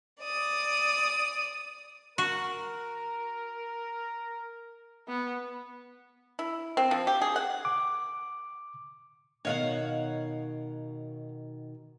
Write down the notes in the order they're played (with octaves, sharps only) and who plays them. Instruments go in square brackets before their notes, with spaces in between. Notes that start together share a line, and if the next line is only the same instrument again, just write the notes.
[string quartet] D5 D#6
[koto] F#4 [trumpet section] A#4
[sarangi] B3
[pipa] E4
C4
F3
G4
G#4
F#5
[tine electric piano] D6
[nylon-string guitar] B2 D#3 D#4 [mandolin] C#5 F5 F#5